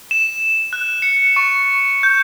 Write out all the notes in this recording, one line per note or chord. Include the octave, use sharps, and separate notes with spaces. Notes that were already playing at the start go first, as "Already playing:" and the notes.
E7
F#6
C#7
C#6
G6